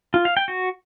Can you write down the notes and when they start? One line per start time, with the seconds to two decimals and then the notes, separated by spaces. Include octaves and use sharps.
0.14 F4
0.25 F5
0.37 G5
0.48 F#4